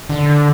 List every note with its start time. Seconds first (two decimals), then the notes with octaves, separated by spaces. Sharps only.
0.10 D3